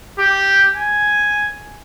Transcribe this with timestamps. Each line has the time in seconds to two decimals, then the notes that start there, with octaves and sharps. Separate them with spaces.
0.19 G4
0.75 G#5